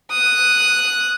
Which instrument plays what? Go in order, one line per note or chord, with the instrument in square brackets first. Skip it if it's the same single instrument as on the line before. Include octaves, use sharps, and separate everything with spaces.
[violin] D#6 F#6